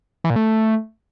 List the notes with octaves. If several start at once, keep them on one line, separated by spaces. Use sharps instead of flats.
E3
A#2
A3